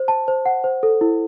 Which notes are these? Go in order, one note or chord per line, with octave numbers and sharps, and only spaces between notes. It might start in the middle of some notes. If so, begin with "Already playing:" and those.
Already playing: C5
A5
C5
F#5
C5
A4
E4